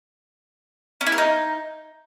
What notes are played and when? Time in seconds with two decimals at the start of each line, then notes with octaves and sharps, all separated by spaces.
1.01 C#4
1.06 E4
1.12 A#4
1.18 D#4